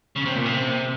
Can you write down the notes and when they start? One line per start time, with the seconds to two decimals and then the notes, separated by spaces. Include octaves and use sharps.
0.16 C#3
0.25 C3
0.35 A#2
0.46 C3